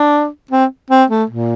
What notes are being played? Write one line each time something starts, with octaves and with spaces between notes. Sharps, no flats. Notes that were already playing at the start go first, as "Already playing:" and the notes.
Already playing: D4
C4
C4
A3
A#2